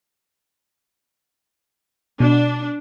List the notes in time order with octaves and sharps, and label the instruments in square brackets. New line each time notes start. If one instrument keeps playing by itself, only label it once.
[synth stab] B2 [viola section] D4